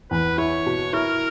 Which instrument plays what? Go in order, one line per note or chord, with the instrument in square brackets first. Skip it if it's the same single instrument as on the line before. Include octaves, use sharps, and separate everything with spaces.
[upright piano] E2 [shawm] B4
[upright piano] E4 [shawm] C#5
[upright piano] B2
[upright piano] E4 [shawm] A#4